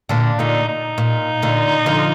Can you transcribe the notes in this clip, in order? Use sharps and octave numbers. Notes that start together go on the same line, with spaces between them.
A#2 D3 D4
A#2 D3 D#4
D#4
A#2
A#2 D3
D3 F3